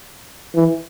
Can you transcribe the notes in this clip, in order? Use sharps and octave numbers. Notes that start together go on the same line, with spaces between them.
E3